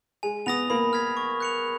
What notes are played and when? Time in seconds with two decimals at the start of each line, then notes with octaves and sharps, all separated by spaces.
0.23 G#3 G#5
0.46 B3 D#6 A#6 F7
0.70 A#3 B5
0.93 F6 G#6 B6
1.17 C#6
1.40 F#6 C#7 F7